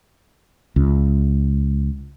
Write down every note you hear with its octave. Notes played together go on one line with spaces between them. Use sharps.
C#2